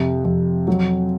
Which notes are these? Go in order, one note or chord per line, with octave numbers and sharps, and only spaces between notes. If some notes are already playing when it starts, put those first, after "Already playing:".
Already playing: F2 C3
F2
F#3